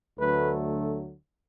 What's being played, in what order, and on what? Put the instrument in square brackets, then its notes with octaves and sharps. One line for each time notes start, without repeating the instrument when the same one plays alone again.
[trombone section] D2 D3 F#3 A3 B4